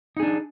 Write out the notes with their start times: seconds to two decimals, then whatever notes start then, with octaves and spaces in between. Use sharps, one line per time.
0.17 D#4
0.20 G#4
0.23 D4